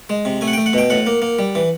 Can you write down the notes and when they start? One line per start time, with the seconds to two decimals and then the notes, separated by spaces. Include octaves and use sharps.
0.10 G#3
0.25 C3
0.41 A3 G#5
0.48 F#5
0.53 A3 G5
0.66 F#5
0.73 B2 G5
0.90 A2 F#5
1.07 A#3
1.22 A#3
1.39 G3
1.55 E3